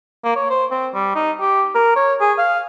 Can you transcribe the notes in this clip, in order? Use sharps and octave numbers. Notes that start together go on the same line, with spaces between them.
A#3
C#5
C5
C4
G3
D#4
G4
A#4
C#5
G#4
F5